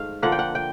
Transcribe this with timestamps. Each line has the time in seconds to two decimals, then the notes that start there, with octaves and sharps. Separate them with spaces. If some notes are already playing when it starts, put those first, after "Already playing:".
Already playing: G#2 A3 F5
0.22 D3 F3 A#3 F#5
0.32 G5
0.39 F#5
0.55 G5